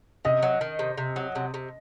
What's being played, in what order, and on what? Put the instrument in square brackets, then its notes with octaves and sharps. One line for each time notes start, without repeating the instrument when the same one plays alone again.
[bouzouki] C3 [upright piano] D#5
[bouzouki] F#3
D#3
C3
C3
F#3
C3
C3